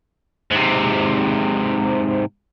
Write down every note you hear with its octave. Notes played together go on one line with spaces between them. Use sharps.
G#2 C3